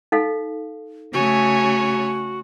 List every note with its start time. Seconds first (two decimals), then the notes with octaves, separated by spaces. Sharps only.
0.12 D#4 A4 F5
1.13 C#3 A3 F#4 C#5 G#5